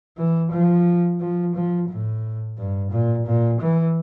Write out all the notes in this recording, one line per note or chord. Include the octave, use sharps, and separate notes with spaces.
E3
F3
F3
F3
A2
G2
A#2
A#2
E3